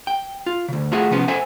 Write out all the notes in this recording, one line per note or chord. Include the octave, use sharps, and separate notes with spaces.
G5
F4
D2 C#3
A3 F4 F#4 G#4 E5
C3 F3 B3 C#4
A4 C5 E5 G#5